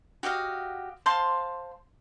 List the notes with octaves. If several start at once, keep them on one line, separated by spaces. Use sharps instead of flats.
F#4 G4 D#5 F5
C5 F5 A5 C6